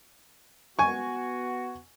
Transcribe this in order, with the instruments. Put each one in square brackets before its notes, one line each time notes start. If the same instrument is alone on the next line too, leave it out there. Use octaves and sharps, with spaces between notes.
[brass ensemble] B3 F#4 [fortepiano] G#5 C#6